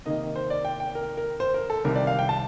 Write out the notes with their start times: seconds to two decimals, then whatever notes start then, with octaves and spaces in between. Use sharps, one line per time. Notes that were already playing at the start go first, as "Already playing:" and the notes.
0.05 C3 D#3 A#3 D#4 D#5
0.36 C5
0.50 D5
0.65 G5
0.80 G5
0.95 A#4
1.17 A#4
1.40 C5
1.54 A#4
1.70 A4
1.84 C2 C3 D#3 A#4
1.95 D5
2.07 F5
2.19 G5
2.29 A5